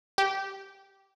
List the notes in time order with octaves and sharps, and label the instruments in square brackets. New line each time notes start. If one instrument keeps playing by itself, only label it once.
[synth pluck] G4